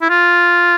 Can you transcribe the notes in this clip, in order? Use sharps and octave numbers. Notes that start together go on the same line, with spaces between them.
E4
F4